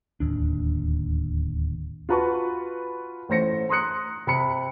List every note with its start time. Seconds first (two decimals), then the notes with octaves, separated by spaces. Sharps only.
0.20 D1 D#2 D4
2.09 F4 F#4 B4 A5 C#6
3.29 A1 A2 C5 A#6 C#7
3.69 A#5 C6 D#6 F#6 C#7
4.27 C3 B5 C#7